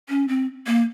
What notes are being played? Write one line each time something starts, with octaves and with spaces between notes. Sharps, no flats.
C#4
C4
A#3